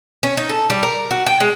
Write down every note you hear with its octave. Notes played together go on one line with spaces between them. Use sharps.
C#4
D#4
A4
G3
A#4
F#4
G5
G#3